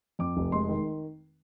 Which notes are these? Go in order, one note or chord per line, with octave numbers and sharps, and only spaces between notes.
F2 D6
F1
G#3 C6
D#3